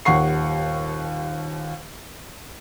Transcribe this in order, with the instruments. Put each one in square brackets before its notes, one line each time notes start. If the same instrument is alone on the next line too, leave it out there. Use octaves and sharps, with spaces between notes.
[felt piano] D#1 D#2 F#5 C#6 C7